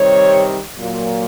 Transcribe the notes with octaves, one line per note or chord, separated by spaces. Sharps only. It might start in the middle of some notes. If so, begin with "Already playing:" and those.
Already playing: C3 D#3 G3 C4 C#5
A#2 F#3 A#3